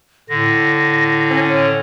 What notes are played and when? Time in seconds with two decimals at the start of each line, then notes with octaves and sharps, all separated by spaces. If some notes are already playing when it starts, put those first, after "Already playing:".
0.29 A2 D3 A#6
1.31 C#4